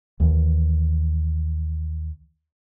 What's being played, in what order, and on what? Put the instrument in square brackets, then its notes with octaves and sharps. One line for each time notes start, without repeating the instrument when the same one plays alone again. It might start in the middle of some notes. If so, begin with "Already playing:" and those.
[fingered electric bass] D#2 E3